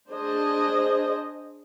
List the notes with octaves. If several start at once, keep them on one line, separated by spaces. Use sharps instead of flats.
D4 G#4 C5 D#5